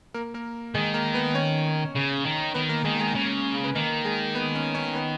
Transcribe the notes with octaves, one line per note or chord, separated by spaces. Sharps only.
A#3 A#4
A#3 A#4
D#3 G#3 G#4
A#3 A#4
B3 B4
C#4 C#5
C#3
D#3
D#3 B3 B4
A#3 A#4
D#3 G#3 G#4
G#3 G#4
C#3
B4
D#3 A#3 A#4
G#3 G#4
B3 B4
C#4 C#5
C#4 C#5
B3 B4